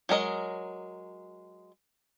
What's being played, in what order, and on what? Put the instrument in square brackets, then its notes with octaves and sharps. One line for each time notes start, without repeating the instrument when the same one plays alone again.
[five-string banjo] F#3 G#3 A#4 D#5